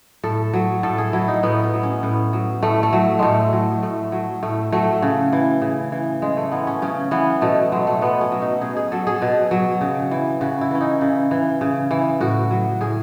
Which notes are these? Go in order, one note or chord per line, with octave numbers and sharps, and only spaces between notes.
A2 A4
F#3
A2 A4
G#4
F#3 E4
D#4
A2 B3
B3
F#3
C#4
A2 B3
F#3
A2 A3
A3
F#3
A2 G#3 A3
F#3
A2 A3
F#3
A2 A3
F#3 A3
C#3
E3
C#3
E3
C#3 G#3
A3
E3 B3
C#4
C#3 C#4
E3 B3
B2 A3
F#3 G#3
A3
B2 B3
C#4
F#3
D#4
B2 G#4
G#4
F#3 A4
G#4
B2
F#3
C#3
E3
C#3 F#4
E4
E3 C#4
D#4
C#3
E3
C#3
E3
A2 F#4
F#3
A2 G#4